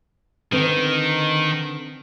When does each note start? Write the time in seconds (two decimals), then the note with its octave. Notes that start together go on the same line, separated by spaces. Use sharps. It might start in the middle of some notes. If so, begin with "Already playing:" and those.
0.52 D3 D#3 C4 B4